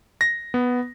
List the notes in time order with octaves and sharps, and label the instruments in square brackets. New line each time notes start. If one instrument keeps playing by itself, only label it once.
[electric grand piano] A#6
B3